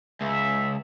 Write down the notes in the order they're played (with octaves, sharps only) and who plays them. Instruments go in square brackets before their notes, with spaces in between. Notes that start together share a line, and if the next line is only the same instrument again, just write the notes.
[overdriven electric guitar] C#2 [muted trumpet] E5